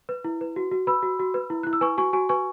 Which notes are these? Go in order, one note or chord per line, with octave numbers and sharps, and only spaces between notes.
B4
E4
B4
F#4
F#4
B4 B5 E6
F#4
F#4
B4
E4
E4 F#6
E6
B4 G#5 C#6
F#4 G#5 C#6
F#4 G#5 C#6
B4 G#5 C#6